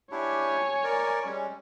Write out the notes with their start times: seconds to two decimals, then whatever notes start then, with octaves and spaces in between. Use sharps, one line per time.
0.12 D4 E4 G4 C#5 G#5
0.84 A#4 D5
1.25 G3 G#3 C#4